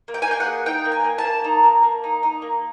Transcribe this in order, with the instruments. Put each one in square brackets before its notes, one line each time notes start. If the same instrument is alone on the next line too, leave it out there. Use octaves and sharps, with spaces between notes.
[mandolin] A#3
G5
G#5
A#3 G5
F#5
G#4
D#4 G5
A#3
G#5
A#3
A5
A#3
D#4
A#3
A#3
D#4
D#4
A#3